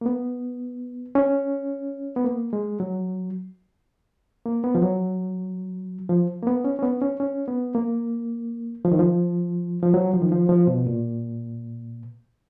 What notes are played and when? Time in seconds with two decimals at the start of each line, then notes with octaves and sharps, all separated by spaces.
0.01 A#3
0.06 B3
1.15 C#4
2.16 B3
2.25 A#3
2.53 G#3
2.80 F#3
4.45 A#3
4.64 B3
4.75 F3
4.82 F#3
6.10 F3
6.43 A#3
6.47 B3
6.64 C#4
6.79 C#4
6.83 B3
7.02 C#4
7.20 C#4
7.48 B3
7.75 A#3
8.85 F3
8.92 D#3
8.99 F3
9.83 F3
9.94 F#3
10.13 F3
10.22 D#3
10.32 F3
10.49 F3
10.67 B2
10.87 A#2